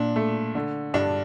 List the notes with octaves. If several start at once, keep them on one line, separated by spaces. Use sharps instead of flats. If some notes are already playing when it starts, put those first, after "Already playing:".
Already playing: A#2 D4
A3
D3
G2 D4